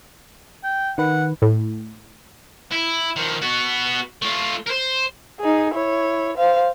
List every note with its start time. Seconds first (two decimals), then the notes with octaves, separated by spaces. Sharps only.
0.64 G5
0.98 D#3 B4 F#5
1.42 A2
2.71 E4
3.16 D#3 F3
3.42 B3 F#4
4.22 A3 F4
4.67 A#4 C5
5.40 D#4 G#4
5.74 E4 C#5
6.37 C5 F5